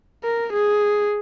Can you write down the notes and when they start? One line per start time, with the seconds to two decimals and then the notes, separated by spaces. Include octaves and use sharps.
0.24 A#4
0.53 G#4